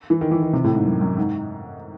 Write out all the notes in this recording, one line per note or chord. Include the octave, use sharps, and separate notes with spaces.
E3
D#3
E3
D#3
C3
A2
G#2
F#2
F#2
G#2